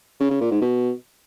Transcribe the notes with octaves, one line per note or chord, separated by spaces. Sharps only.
C#3
C#3
A#2
G#2
B2